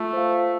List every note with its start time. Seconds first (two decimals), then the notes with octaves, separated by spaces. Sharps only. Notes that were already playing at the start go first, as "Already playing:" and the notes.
Already playing: A3 F4
0.13 C5 F5